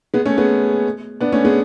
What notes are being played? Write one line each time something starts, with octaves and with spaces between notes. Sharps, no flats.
G#3 B3
A3 C#4
G#3 B3
B3 D4
A3 C#4
G#3 B3